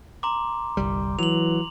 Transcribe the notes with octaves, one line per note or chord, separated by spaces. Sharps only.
A#5 C6 D6
G1 C2 G3
E3 F#3 F7 F#7